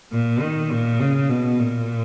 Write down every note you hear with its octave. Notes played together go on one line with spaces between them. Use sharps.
A#2
D#3
A#2
C#3
B2
A#2